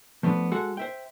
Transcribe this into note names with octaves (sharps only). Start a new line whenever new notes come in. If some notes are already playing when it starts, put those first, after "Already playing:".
F3 A3 B3 D4
G#3 F#4 A4 F#5
C5 E5 G5